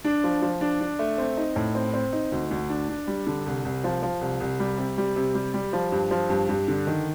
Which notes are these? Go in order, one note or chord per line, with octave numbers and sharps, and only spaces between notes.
D4
F3
F3
D4
D4
A3
C4
D#4
A2
C4
C4
D#4
D2
D2
D4
D4
G3
D3
C2
C2
F3
F3
C2
C2
G3
C3
G3
C3
G3
G3
F3
G2
F3
G2
G2
D3
D#3